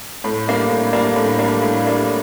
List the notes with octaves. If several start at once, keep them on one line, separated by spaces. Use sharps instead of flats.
A2
G3 A#3 D4
A2
G3 A#3 D4
A2
G3 A#3 D4
A2
G3 A#3 D4